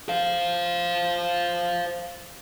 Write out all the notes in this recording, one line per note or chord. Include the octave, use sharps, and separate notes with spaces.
C5 F5